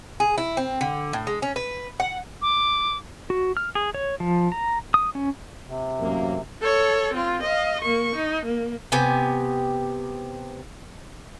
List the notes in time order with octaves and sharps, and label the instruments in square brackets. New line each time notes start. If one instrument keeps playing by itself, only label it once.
[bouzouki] G#4
E4
C4
D3
A2
G#3
C#4
B4
F#5
[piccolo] D6
[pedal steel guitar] F#4
F6
G#4
C#5
F3
A#5
D#6
C#4
[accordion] C3
[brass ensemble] A1 F#2 A#3
[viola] A4 C#5
C4 F4
D#5 F5
A#3 C#6
D#4
A#3
[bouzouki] C3 B3 G4 G#5